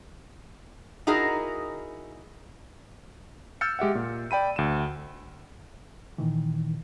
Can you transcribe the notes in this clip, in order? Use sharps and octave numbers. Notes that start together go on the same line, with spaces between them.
D#4 E4 F#4 G#4 A#4 D#5
E6 F6 G6 A6 C#7
G#3 G4 E5 F#5
A#2
D5 G5 B5 D#7
D2 E7
A#2 D#3 E3